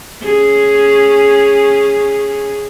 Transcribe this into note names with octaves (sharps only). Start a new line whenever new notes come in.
C#4 G#4